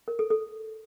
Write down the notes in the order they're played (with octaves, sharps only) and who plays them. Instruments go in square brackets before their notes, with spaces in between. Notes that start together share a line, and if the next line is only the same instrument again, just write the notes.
[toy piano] A#4
A4
A4